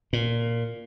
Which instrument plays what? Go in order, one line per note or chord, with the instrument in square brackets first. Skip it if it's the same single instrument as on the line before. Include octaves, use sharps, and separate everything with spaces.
[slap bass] A#2